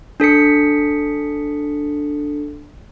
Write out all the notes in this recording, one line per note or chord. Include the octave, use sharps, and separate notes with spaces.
D4 A4 B6 C#7